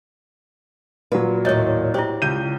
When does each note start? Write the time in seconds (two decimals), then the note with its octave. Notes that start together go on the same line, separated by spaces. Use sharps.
1.12 A#2 F#3 B4
1.45 D#2 A2 C#5 D#5
1.94 E4 G4 C5
2.22 C#2 G6 D#7